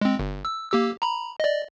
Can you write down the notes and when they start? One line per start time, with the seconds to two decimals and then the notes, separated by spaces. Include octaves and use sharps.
0.01 G#3 C4
0.19 G1
0.45 E6
0.72 A#3 G4 E6
1.02 A#5 B5
1.40 D5 D#5